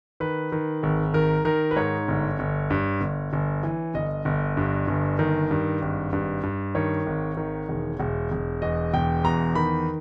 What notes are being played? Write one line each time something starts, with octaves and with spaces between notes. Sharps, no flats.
D#3 B4
D#3
G#1
D#3 A#4
D#3 A#4
B4
G#2 C#5
G1
G1
G2
G1
G1
E3
G1 D#5
G1
G2
G1
D#3
G2
G#1
G2
G2
D#3 C#5
G#1
D#3
E1
E1
E1
E2 D#5
E1 G5
E2 A#5
D#3 B5